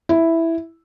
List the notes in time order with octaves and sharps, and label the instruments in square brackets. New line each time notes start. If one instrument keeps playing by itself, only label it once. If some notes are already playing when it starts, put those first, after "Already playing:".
[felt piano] E4